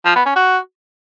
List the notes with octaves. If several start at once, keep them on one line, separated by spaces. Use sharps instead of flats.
F3
B3
C#4
F#4